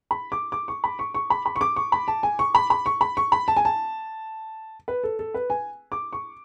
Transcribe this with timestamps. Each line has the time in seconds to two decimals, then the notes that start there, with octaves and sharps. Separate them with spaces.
0.11 B5
0.32 D6
0.52 D6
0.68 C#6
0.84 B5
0.99 C#6
1.14 C#6
1.30 B5
1.46 B5
1.56 C#6
1.61 D6
1.76 C#6
1.92 B5
2.08 A5
2.23 G#5
2.39 C#6
2.55 B5
2.70 B5
2.86 C#6
3.01 B5
3.17 C#6
3.32 B5
3.48 A5
3.57 G#5
3.65 A5
4.88 B4
5.04 A4
5.19 A4
5.34 B4
5.50 G#5
5.92 D6
6.13 C#6